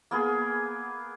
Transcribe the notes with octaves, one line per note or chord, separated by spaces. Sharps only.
A#3 B3 G#4